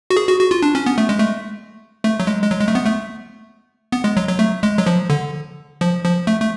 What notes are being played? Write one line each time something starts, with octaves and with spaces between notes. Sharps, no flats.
F#4
G#4
F#4
F#4
F4
D4
C#4
B3
A3
G#3
A3
A3
F#3
G#3
G#3
F#3
G#3
A3
B3
A3
B3
G#3
F#3
F#3
A3
G#3
F#3
F3
D3
F3
F3
A3
A3